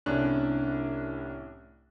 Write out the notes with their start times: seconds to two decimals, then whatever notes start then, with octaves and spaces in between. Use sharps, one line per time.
0.06 C2 A2 C#4 D4 D5 F#6